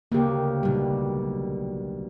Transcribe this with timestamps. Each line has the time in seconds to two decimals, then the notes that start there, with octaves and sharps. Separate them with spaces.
0.12 D2 C#3 A#3 G4
0.63 B1 A#2 G3